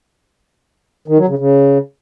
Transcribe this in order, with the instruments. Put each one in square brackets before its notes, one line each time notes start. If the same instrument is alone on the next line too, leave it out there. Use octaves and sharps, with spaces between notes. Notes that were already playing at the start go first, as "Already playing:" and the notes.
[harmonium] D#3
F#3
C#3
C#3